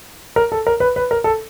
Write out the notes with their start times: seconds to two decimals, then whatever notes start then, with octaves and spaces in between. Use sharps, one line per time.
0.36 A#4
0.52 A4
0.67 A#4
0.80 B4
0.96 B4
1.11 A#4
1.24 A4